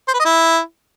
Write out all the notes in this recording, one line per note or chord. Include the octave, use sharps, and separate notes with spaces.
C5
B4
D#5
E4